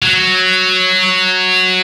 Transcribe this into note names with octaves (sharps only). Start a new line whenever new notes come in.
F#3